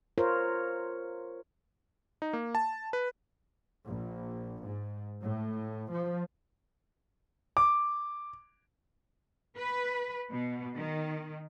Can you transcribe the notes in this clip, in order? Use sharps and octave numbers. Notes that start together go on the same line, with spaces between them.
F4 A#4 C5 C#5
D#4
A#3
A5
B4
A#1
G#2
A2
F3
D6
B4
B2
D#3